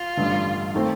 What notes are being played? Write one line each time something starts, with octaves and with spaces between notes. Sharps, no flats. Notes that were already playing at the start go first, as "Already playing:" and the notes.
Already playing: F4
A1 G2 D3
D#3 A3 C4